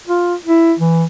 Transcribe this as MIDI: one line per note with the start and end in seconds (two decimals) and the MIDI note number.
0.07 0.34 65
0.46 0.74 64
0.79 1.04 52